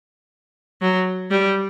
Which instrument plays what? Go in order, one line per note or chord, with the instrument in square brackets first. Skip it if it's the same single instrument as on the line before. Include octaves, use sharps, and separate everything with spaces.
[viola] F#3
G3